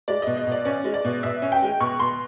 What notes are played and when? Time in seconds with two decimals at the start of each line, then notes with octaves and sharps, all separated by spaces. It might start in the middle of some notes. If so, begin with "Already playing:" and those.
0.08 G#3 D5
0.22 B2 D#5
0.37 D#5
0.47 B2 D5
0.65 C#4 D5
0.84 G#3
0.94 D5
1.05 B2
1.23 B2 E5
1.42 C#4
1.52 G5
1.62 G#3
1.80 B2 C#6
1.99 B2 C6